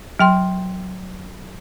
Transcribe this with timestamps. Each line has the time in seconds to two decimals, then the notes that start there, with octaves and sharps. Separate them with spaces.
0.19 F#3 G5 C6